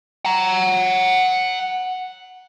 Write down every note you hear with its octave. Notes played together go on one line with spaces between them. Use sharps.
F#5 A#5